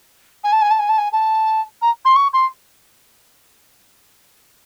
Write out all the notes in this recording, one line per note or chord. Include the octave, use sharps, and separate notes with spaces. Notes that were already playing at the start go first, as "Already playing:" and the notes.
G#5
A5
G#5
A5
G#5
A5
G#5
A5
A#5
C6
C#6
C6